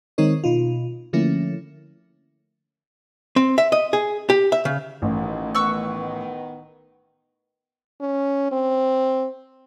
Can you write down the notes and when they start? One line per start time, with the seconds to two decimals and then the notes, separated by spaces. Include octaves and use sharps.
0.18 D#3 G#3 C4 D#4 A#4 C#5
0.44 B2 D#4 F4
1.13 D3 F3 A3 A#3 C#4 E4
3.36 C4
3.58 E5
3.72 D#5
3.93 G#4
4.30 G4
4.52 E5
4.65 C#3
5.02 A1 D#2 B2 D#3
5.55 D#3 B3 C#6 E6 F#6
8.01 C#4
8.52 C4